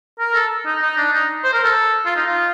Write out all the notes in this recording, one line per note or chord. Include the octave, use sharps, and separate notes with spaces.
A#4
A4
D#4
D#4
D4
D#4
C5
A#4
A4
F4
D#4
F4